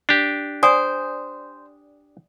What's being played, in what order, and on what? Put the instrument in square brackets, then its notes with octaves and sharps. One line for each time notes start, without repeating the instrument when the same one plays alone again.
[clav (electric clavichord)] D4 G4
[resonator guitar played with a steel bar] C5 [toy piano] D5 G#5 D#6